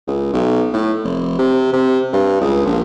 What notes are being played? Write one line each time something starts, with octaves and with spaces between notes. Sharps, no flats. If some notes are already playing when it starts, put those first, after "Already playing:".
C#2
B1
A2
F1
C3
C3
G2
C#2
A#1